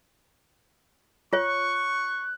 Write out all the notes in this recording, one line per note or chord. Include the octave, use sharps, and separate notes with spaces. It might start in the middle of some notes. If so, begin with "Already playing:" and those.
F4 C#5 C#6 F#6